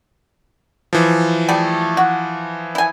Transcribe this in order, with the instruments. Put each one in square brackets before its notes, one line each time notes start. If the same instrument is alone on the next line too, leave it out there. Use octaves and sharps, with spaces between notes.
[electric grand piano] E3 F3
[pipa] G3 A3 G#4
F#4
E4 G#5